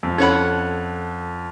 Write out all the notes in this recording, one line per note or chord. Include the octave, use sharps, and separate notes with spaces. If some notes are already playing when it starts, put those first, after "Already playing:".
F2
C#4 A4 C#5 F#5 B5